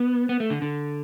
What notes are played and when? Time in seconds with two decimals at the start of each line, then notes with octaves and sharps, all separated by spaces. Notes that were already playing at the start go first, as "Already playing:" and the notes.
Already playing: B3
0.29 B3
0.40 A3
0.50 D3
0.62 D3